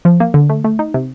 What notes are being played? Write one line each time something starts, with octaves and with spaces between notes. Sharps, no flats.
F3
A#3
D3
A3
A3
D#4
C3